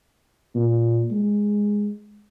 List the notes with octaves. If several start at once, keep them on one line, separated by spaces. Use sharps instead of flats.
A#2
G#3